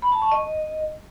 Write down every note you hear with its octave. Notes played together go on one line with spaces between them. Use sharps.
B5
A5
C#6
D#5